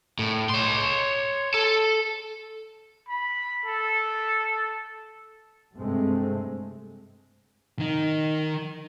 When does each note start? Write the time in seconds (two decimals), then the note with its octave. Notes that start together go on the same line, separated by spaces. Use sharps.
0.19 A2
0.49 C#5 C6
1.54 A4
3.09 B5
3.65 A4
5.75 G2 C3 G#3 A3 C4
7.79 D#3 D#4